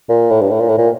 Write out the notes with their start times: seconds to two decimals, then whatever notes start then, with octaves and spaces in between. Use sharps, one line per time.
0.09 A#2
0.31 A2
0.41 G2
0.50 A2
0.60 A#2
0.69 A2
0.78 A#2